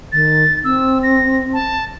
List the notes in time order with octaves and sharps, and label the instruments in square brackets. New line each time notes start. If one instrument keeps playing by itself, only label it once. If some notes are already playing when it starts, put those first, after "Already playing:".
[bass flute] D#3 [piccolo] A6
[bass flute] C4 [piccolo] E6
[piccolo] A#6
A5